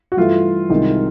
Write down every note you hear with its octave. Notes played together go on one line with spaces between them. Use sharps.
F#4
G2 E3 A3 F4
C2 C3 D#3 G#3